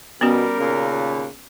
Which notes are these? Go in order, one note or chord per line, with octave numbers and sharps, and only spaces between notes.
B2 G3 B3 C#4 F#4 A#4
D#2 A#2 C#3